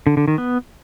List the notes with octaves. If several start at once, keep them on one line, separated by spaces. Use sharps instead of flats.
D3
D3
D#3
B3